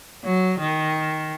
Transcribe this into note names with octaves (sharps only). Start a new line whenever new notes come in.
F#3
D#3